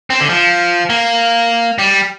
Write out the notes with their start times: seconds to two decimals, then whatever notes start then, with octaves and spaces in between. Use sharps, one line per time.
0.10 C4
0.20 D3
0.30 F3
0.90 A#3
1.79 G3